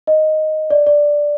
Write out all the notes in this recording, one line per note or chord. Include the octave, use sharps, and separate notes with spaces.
D#5
D5
D5